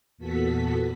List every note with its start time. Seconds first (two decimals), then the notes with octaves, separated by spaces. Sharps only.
0.18 E2 A#2 B3 F#4 A4 B6